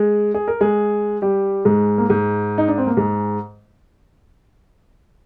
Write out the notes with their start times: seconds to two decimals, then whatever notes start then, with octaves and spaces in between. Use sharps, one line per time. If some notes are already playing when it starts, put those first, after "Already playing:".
Already playing: G#3 G#4
0.34 G#4
0.48 A#4
0.61 G#3 G#4
1.22 G3 G4
1.65 G#2 G#3
1.98 A#3
2.10 G#2 G#3
2.58 D#4
2.68 D4
2.78 C4
2.87 A#3
2.97 G#2 G#3